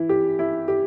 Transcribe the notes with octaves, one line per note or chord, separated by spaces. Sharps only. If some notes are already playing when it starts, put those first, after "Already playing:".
Already playing: E3 E4
G4
E4
G4